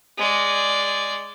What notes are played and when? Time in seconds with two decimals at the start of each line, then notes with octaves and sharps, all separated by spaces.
0.18 G#3 D5